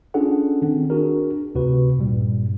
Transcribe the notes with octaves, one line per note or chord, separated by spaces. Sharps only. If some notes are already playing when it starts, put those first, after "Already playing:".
C#4 D4 F4 G#4 A4 F#5
D#3 C4
D4 F#4 G#4 A#4
D2 C3 F#4 B4
G2 A#2 G3